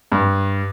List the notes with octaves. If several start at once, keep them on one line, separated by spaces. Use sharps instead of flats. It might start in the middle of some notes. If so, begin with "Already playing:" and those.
G2